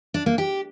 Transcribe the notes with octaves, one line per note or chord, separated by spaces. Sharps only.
D4
A#3
G4